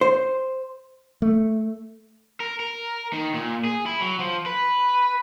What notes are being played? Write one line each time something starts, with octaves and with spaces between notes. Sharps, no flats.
C5
A3
A#4
A#4
D#3
A#2
G#4
E4
F#3
F3
B4